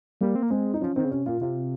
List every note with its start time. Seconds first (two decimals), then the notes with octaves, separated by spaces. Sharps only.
0.21 G3 A#3
0.35 C4
0.43 A#3
0.50 G#3 C4
0.74 D#4
0.81 F3 C#4
0.96 D#3 C4
1.05 C#3
1.11 C3 C#4
1.26 A#2 F4
1.41 C3 F4